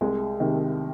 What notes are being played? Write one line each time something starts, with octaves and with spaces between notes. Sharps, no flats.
C2 G#3
C3 D#3